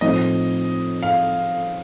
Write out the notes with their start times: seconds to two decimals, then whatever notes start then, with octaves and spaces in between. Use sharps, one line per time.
0.01 A2 F3 C4 D#4 D#5
1.02 F5